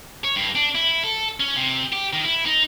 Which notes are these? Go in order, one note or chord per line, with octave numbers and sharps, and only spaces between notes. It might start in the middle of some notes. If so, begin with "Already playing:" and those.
C#5
G2
D4
E4
A4
C#4
C3
G4
D#3
E4
D#4